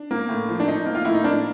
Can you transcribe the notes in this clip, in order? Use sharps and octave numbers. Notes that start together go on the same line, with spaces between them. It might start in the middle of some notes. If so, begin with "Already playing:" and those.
Already playing: D4
A#3
A2
F3
D4
F3 D#4
A#3
F4
A2 E4
D#4
A#3 D4